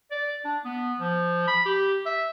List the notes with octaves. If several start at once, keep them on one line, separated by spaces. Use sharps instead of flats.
D5
D4
B3
F3
B5
G4
E5